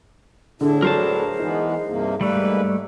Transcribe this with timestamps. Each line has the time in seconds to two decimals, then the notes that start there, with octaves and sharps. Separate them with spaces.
0.61 A2 D3 D4 E4 G#4
0.82 F#3 A#4 C5 A5
1.39 E3 G#3 B3 D#4
1.87 G2 C3 A#3
2.21 G#2 G3 A3 A#3 B4 D5